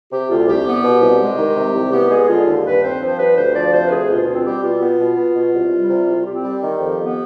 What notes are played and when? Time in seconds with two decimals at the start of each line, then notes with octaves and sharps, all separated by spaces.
0.12 C3 G4
0.30 D2 F4
0.47 C2 G4
0.66 B3
0.84 B2
1.02 C2
1.20 G#3
1.38 D#3
1.56 C3
1.74 C2
1.92 B3 G4
2.10 G#3 G#4
2.29 D3 F4
2.47 D#2
2.65 G2 B4
2.83 C4 C5
3.01 F3
3.07 C5
3.19 G2 B4
3.37 D2 C5
3.55 F3 D5
3.73 C3 C5
3.84 B4
3.91 D2 G#4
4.09 B2 F4
4.27 C4 F4
4.46 G3 G4
4.64 B2 F4
4.82 B3
5.00 B2
5.18 B3
5.36 B2
5.54 C2
5.72 G3
5.90 C3
6.08 C2
6.15 F4
6.26 C4 G4
6.44 G3
6.63 D#3
6.80 F2
6.99 B3